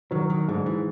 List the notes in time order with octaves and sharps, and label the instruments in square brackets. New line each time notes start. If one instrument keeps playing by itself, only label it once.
[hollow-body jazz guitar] D#3 [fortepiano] F#3
[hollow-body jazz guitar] D#3
[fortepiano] G#2 [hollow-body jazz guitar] D3
[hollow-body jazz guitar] E3